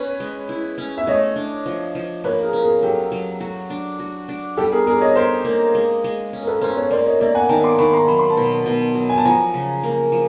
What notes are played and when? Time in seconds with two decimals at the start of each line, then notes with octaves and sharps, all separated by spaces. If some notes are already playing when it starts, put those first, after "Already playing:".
Already playing: C#4 B4 C#5
0.20 G#3
0.49 E4
0.78 C#4
0.98 E5
1.07 A3 C#5 D#5
1.36 D4
1.66 F3
1.95 F3
2.24 A#3 B4 C#5
2.43 G#4 A#4
2.53 C#4
2.63 G#4 A#4
2.82 F#3 G4 A4
3.12 F#3
3.41 F#4
3.70 D4
3.99 F#4
4.29 D4
4.57 G3 G4 A4
4.72 G#4 A#4
4.87 D4 G#4 A#4
5.01 C#5 D#5
5.15 G4 A#4 C5
5.45 A#3
5.75 G#3
6.04 G#3
6.33 C#4
6.43 A#4
6.47 A4 B4
6.61 C#4 A#4 C5
6.77 B4 C#5
6.91 A#3 C5 D5
7.06 C#5 D#5
7.20 A#3 D5 E5
7.35 F#5 G#5
7.49 D#3 G5 A5
7.64 C6 D6
7.79 D#3 B5 C#6
7.93 A#5 C6
8.07 F#3 B5
8.19 C6
8.30 A5 B5
8.37 B2
8.66 B2
8.95 F#3
9.09 G#5
9.18 A5
9.25 F3 G#5 A#5
9.54 C#3
9.83 A#3
10.12 F3